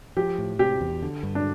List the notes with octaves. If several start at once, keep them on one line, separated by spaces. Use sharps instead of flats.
F3 G4
A2
C3 G4
E2
D3
G2
D4